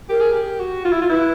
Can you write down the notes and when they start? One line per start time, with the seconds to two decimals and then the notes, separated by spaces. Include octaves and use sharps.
0.09 G4 A#4
0.20 G#4
0.32 G4
0.60 F#4
0.85 F4
0.93 E4
1.01 F4
1.10 E4 B4